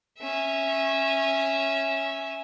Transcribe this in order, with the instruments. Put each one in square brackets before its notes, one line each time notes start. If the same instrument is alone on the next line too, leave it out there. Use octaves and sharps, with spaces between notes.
[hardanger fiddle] C#4 E5